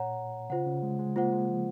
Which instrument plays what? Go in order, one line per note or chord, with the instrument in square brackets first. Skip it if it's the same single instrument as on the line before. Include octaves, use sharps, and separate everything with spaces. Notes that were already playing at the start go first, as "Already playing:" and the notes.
Already playing: [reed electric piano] A#2 [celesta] C#5 F#5 A#5
[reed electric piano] C#3 [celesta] F4 C5 F#5
[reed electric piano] C#3
G#3
G#3
[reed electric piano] A#3 [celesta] F4 C5 F#5
[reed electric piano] G#3
F3